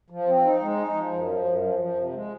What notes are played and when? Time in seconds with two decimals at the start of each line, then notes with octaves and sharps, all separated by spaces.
0.10 F3
0.27 C4
0.44 D#4
0.61 G#3
0.78 D#4
0.94 F3
1.11 F#2
1.28 F3
1.45 F#2
1.62 F3
1.79 F3
1.95 C3
2.13 G#3